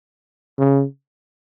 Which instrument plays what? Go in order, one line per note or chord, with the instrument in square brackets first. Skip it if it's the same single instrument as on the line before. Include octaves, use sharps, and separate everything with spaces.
[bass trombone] C#3